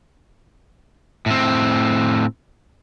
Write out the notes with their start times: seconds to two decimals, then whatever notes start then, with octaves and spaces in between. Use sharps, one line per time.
1.26 A2 C4